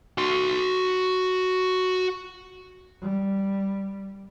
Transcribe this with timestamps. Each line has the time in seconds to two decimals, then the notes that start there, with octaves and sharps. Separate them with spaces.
0.18 F#4 C6
3.01 G3